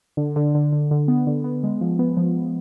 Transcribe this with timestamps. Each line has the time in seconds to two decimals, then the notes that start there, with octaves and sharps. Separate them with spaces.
0.17 D3
0.36 D3
0.55 D3
0.72 D3
0.91 D3
1.08 B3
1.27 D3
1.44 B3
1.63 G#3
1.81 F3
1.99 B3
2.17 F3
2.35 F3